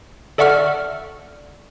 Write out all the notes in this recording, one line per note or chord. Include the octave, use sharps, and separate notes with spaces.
A4 D5 E5 F#5 C#6 F6